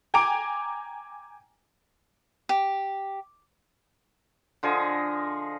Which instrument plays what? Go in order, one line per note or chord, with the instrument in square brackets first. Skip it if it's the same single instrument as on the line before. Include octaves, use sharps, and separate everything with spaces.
[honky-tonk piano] G5 G#5 A#5 D6 D7
[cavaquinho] G4
[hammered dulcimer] D3 F3 G#4 D#5